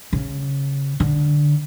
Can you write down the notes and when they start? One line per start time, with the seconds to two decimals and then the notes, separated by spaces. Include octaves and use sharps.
0.13 C#3
1.00 D3